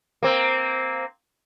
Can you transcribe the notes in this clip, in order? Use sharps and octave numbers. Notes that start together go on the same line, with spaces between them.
A#3 C4